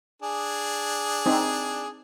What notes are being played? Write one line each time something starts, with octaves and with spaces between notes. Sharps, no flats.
D4 G#4
C4 D#4